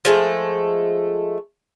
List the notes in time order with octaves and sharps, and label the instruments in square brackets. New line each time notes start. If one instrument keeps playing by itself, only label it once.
[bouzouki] F3 G#3 A3